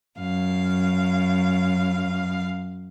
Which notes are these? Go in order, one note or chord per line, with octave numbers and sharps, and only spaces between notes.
F#2 F5